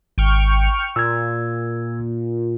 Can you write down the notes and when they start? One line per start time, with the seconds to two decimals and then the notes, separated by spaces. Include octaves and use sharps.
0.18 G#1 G5 C#6 F6
0.96 A#2 E6 G#6